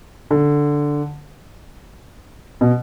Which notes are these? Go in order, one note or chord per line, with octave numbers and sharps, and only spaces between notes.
D3
B2